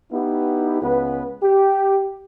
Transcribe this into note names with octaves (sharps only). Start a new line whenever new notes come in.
B3 D#4 E4 G4
C#2 B3 B4
G4